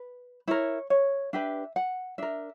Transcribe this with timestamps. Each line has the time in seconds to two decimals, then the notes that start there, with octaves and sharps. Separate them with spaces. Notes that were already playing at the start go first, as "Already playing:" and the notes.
Already playing: B4
0.48 E4 A#4 C#5
0.90 C#5
1.33 D4 G4 B4 E5
1.76 F#5
2.18 D4 A#4 E5